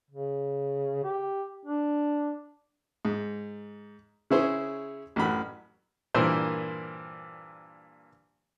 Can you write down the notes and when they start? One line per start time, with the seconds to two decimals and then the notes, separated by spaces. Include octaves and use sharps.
0.11 C#3
1.04 G4
1.65 D4
3.05 G#2
4.30 C#3 C#4 E4 G#4 C5
5.16 A1 F#2 B5
6.14 G2 A#2 E3 A#4 C5